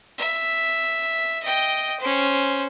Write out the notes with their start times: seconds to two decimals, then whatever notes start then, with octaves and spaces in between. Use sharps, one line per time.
0.18 E5
1.43 D#5 G5
2.00 C#4 C5